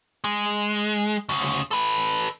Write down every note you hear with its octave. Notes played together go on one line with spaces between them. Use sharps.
G#3
D2 C#3
A4 B4